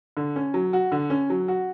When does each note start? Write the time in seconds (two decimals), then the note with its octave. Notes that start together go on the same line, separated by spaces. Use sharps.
0.17 D3
0.36 C#4
0.54 F#3
0.73 F#4
0.92 D3
1.10 C#4
1.30 F#3
1.48 F#4